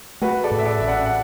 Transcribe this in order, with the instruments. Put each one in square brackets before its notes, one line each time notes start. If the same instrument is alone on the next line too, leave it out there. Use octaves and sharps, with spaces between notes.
[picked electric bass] A3 [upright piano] F#4 B4
[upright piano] A4 D5
[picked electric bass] A2
[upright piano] E5
A4 D5
[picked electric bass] A1 [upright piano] E5
[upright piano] D5 F#5
F#5